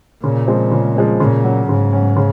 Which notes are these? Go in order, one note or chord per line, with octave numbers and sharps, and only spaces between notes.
A#2 C#3
F3 G#3 C4
C#3
F3 G#3 C4
A#2 C#3
F#3 C#4
G#2 C#3
F#3 C#4
C#3